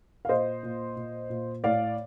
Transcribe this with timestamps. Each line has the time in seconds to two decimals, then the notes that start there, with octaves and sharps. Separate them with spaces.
0.25 F5
0.29 A#2 C5 D#5
0.63 A#2
0.96 A#2
1.30 A#2
1.64 A2 D5 F5